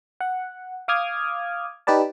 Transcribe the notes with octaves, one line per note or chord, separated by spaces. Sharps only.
F#5
F5 D6 D#6 F6 G#6
D#4 G4 B4 D5 A5